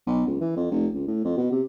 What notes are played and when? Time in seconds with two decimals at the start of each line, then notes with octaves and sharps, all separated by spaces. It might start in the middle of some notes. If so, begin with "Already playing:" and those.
0.07 B1
0.27 C#2
0.41 E3
0.56 F2
0.71 F1
0.94 C#2
1.08 A2
1.24 F2
1.37 B2
1.51 C3